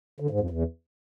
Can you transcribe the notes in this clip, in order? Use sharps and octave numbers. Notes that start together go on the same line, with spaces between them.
D3
G#2
F2
E2